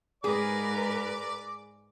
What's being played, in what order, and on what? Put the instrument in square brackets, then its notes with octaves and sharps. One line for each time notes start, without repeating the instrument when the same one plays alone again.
[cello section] G#2 A#4 B4 [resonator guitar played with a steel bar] G#4 [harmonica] D5 D6